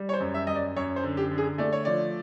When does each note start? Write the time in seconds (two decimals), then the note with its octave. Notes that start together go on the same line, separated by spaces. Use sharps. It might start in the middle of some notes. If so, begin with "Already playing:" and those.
Already playing: G3
0.09 C#5
0.13 C5
0.20 F#2
0.34 E5
0.47 F#2 D#5
0.55 D5
0.77 F#2 C#5
0.96 C5
1.03 D3
1.17 G4
1.31 D3
1.38 G#4
1.58 A3 D5
1.73 C#5
1.85 F3 D5